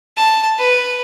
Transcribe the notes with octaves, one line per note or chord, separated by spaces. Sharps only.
A5
B4